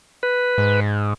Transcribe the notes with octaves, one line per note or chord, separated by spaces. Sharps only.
B4
G#2